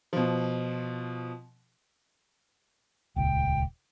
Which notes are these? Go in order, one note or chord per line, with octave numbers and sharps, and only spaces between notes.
B2 F3
D#1 C#2 G5